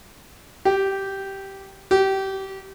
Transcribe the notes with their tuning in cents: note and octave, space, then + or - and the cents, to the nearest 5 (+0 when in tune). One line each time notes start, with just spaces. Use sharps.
G4 -10
G4 -25